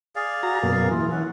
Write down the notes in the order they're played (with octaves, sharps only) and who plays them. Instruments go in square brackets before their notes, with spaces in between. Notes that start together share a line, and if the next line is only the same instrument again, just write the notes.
[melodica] G#4 D5 F5
[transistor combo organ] F#4 A#5
F#2 B2 A#3
[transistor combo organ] E3 [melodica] F4
[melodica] C#4 F#5